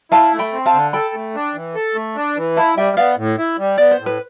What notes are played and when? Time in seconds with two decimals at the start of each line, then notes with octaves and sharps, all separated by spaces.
0.12 E4 F5 A5
0.33 A3
0.39 G5 B5
0.53 C4
0.66 F5 A5
0.73 D3
0.93 A4 G5 B5
1.14 A3
1.35 D4
1.54 E3
1.75 A4
1.95 A3
2.16 D4
2.37 E3
2.56 E4 F5 A5
2.77 G3 E5 G5
2.97 B3 D5 F5
3.17 A2
3.38 E4
3.58 G3
3.78 B3 D5
3.91 C5
4.00 A2
4.06 B4